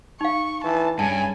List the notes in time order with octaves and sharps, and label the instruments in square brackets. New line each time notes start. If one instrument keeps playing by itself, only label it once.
[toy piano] D#4 F5 [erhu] C#6
[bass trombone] E3 [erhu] A5
[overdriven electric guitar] G2 [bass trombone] C#3 [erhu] G#5 [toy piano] A5